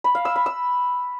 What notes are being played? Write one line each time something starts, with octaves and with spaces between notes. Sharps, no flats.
B5
F5
E6
B5
E6